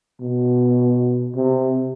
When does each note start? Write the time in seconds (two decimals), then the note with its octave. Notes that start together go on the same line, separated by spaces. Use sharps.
0.21 B2
1.35 C3